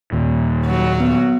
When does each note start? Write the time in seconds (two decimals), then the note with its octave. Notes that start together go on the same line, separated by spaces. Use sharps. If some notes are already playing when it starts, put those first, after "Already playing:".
0.12 D#2 A#2
0.66 F#3
1.00 B3